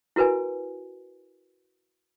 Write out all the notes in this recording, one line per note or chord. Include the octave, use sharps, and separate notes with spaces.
E4 F#4 A#4 B4 G#5